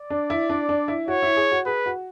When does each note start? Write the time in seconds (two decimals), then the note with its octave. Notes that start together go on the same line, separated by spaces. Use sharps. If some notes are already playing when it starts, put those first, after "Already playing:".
Already playing: D5
0.10 D4
0.30 E4
0.50 D4
0.69 D4
0.88 E4
1.07 F#4 C#5
1.22 E4
1.36 G#4
1.52 F#4
1.66 G#4 B4
1.86 F#4